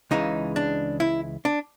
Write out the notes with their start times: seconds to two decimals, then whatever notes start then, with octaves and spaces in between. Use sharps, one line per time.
0.11 C#2 C#3 E3 G#3 D#4
0.56 D4
1.00 E4
1.45 D4